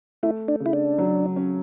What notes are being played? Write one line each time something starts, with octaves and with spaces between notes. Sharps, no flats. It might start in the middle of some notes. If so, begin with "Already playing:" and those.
A3 E4
D4
C#3
E4
D4
F#3
C#4